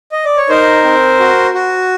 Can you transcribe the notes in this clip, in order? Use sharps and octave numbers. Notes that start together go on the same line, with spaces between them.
D#5
D5
C#5
D#4 A#4 C5
C4
F#4
F#4